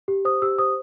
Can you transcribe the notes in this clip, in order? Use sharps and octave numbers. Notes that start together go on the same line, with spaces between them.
G4
C5 D#6
G4 E6
C5 D#6